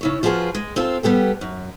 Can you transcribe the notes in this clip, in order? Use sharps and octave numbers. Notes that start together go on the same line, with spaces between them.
C#3 E4 C#5
F3 F4 F#4 G#4 B4
G#3
C4 F4 A4
G3 B3 G4 A4
F#2